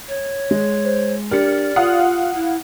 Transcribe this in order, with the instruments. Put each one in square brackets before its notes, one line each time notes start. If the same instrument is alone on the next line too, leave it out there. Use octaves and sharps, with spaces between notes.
[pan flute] C#5
[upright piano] G#3
[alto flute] C5
[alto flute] D4 [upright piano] G4 [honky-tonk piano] A#4 C#7 [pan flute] D5
[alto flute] F4 [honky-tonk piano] F5 F#5 D#6
[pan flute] E4